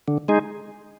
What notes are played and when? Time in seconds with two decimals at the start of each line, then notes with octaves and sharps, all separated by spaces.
0.08 D3
0.28 G#3 D#4 G#4